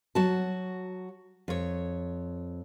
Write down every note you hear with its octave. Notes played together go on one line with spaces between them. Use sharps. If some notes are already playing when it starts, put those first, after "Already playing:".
F#3 F#4 A5
F2 C#5